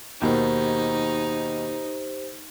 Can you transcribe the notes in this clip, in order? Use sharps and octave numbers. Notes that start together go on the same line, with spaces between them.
D#2 B2 D#3 D#4 G4 C5